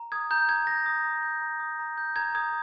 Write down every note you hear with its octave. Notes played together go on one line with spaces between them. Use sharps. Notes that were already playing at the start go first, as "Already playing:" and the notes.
Already playing: A#5
D#6 G#6
A#5 G6
G6 G#6
A#5 A#6
D#6
A#5
G6
A#5
D#6
A#5
G6
A#5 G#6
D#6 G#6